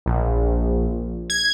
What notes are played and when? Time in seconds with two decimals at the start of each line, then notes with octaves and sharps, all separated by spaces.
0.06 A#1
1.30 G#6